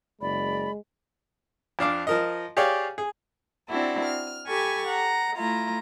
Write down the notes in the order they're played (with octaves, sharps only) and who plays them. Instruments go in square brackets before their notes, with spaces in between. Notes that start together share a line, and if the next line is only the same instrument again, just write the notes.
[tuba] F#1 [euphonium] G#3 [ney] D5 [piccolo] B5
[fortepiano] F2 D4 F5 D6
F3 A#4 D#5
G4 G#4 C#5 D5 F5 G5
G#4
[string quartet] C4 D4 E4 F#4 A4
F6
G4 A4 G#5 B5 C#6
F#5 A#5
A3 E4 F4 A#5